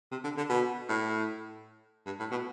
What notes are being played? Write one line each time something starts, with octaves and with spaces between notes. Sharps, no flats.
C3
D3
D3
B2
A2
G2
A2
B2